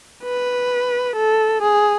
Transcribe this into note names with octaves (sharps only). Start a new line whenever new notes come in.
B4
A4
G#4